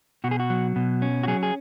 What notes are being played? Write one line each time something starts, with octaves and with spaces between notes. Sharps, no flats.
B2 F#4
G#4
F#4
F#3
B2
C#4
F#4
F#3 G#4
G#4